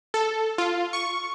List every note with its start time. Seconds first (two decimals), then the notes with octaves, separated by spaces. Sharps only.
0.14 A4
0.58 F4
0.93 C#6